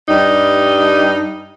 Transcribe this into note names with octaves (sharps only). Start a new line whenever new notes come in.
G2 G3 D#4